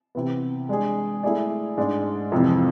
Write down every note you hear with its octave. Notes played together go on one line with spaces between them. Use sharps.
C3 E3 B3
G#3 D4 G#4
A3 E4 G#4 D5
G#2 G#3 D4
F2 C3 E3